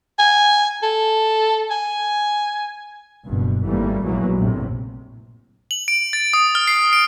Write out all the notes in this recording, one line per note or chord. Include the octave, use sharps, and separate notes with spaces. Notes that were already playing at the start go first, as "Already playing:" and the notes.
G#5
A4
G#5
F#1 G2 B2
G#1 F#2 E3 G3 A3 A#3
A#1 B2 E3 F#3 G#3 A#3
A#1 F#2 A2 C3
F#7
D7
A6
D#6
F6
C7
D7